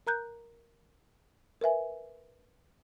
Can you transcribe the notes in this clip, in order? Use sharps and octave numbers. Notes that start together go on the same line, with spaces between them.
A#4 A#5 F#6 G6
A#4 B4 E5 G#5